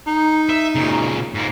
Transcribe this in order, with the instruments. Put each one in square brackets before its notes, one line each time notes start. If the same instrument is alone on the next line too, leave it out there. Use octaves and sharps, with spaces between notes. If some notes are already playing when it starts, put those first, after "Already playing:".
[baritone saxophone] D#4
[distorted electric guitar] E5
A#2 C#3
G#2 A#3